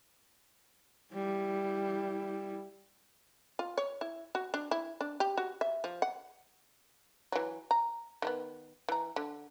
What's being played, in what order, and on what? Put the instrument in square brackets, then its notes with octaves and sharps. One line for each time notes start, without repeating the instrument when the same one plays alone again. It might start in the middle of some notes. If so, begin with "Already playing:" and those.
[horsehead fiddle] G3 E4
[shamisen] F4
C#5
E4
F#4
D4
E4
D4
G4
F#4
E5
F3
F#5
E3 F#3
A#5
D#3 A3 B3
E3 A#5
D3